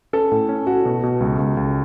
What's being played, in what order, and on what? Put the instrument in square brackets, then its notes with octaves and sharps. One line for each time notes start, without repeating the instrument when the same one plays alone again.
[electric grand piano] C#4 [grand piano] A4
[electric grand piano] A2
C#4
[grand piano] F#4 [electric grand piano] A4
[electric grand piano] B2
B2
C#2
C#2
C#2